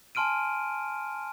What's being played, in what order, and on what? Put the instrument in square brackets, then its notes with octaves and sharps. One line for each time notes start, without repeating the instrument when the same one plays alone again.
[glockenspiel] G#5 A5 C6 F6 D7 D#7